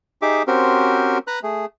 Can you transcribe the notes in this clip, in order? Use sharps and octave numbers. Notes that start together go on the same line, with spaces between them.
D#4 G4 G#4 E5 D6
C4 C#4 F#4 G4 A#4 C5
B4 A#5 B5 F#6
A3 G#4